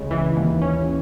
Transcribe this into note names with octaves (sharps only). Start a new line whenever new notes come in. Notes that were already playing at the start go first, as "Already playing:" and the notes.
Already playing: C#2 C#3 G#3
E3
D#2
C#4